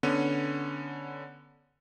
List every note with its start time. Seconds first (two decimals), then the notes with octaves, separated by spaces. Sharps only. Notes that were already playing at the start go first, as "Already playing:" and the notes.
0.03 D3 B3 C#4